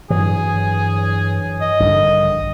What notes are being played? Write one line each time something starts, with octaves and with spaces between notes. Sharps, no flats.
G2 E3 F#3 G#4
D#5
A#1 G2 D3 D#3